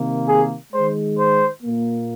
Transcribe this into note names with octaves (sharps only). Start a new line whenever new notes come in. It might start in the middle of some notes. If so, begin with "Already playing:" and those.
Already playing: C3 D#3 A#3
G#4
D#3 G#3 C5
C5
A#2 A#3